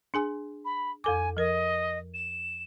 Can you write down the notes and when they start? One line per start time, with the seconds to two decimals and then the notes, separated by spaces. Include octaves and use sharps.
0.14 D4 G#4 G#5
0.65 B5
1.04 F2 A4 G#5 D6
1.37 F3 A#4 D#5
2.14 E7